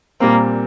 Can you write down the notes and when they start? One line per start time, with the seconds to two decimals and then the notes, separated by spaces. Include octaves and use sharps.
0.20 A#2 G3 A#3 C4